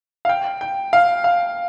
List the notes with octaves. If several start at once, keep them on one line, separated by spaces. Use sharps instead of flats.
F5
G5
G5
F5
F5